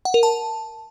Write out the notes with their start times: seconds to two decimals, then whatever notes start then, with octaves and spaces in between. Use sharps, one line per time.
0.05 F#5
0.14 A#4
0.23 A5